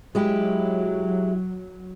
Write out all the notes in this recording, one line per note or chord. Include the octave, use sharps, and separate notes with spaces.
F#3 G#3 E4 G4